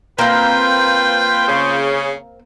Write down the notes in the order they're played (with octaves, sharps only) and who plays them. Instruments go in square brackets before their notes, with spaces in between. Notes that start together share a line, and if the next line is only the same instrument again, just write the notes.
[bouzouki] A#3 C4 [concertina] F4 C5 [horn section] B4 G5
[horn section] C#3